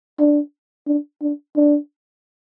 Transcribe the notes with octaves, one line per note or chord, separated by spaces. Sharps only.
D4
D4
D4
D4